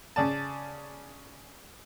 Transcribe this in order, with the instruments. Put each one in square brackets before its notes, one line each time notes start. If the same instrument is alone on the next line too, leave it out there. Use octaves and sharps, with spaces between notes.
[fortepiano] C#3 D5 A5